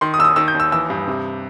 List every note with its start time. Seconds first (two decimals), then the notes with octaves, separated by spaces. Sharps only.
0.01 D#3 C6
0.14 D#6
0.19 D#2 E6
0.24 D#6
0.36 D#3 E6
0.48 G6
0.54 D#2
0.60 E6
0.72 E3 E6
0.90 G2
1.07 C3